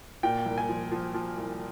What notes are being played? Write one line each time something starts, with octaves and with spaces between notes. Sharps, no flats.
A#2 G5
C2
G#5
F3
F3
F3
C2